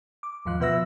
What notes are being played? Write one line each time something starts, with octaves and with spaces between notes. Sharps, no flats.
D6
D#2 G#2 F3 F5 F#6
B2 F3 B4 E5 E6 A#6